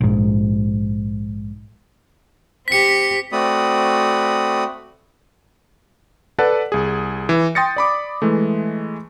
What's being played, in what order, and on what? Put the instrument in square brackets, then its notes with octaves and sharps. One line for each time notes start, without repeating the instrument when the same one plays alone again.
[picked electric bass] A#1 G#2
[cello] C4 G4 [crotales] B6 C#7
[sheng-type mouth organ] A3 C4 F#4 D5 B5 D#6
[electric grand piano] A4 B4 D5 F#5 A5
C2 G#4
E3
G5 C6 D#6 A6 A#6 C#7
D5 B5 D6
E3 G#3 A3